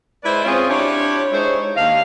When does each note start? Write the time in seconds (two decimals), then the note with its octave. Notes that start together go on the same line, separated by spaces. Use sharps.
0.24 G#3 E4 B4 C5 D5 E5
0.44 C4 C#4 F4 G#4 C5 C#5
0.69 D4 E4 F4 G4 C#5
1.32 G#3 D#4 E4 C5 C#5
1.76 D#2 D4 D#5 F5